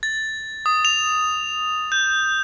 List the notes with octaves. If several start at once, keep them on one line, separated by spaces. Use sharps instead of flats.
A6
D#6
F7
G6